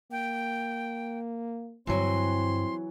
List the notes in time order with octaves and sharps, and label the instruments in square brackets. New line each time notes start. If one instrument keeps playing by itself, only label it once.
[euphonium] A#3 [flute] G5
[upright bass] G2 D3 [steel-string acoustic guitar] E3 F#3 [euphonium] C4 [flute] C6